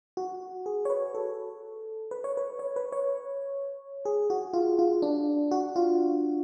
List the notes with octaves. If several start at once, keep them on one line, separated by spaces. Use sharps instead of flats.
F#4
G#4
C#5
B4
A4
B4
C#5
B4
C#5
B4
C#5
G#4
F#4
F4
F4
D4
F#4
F4